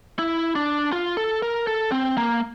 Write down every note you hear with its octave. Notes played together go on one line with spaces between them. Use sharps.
E4
D4
F4
A4
A#4
A4
C4
A#3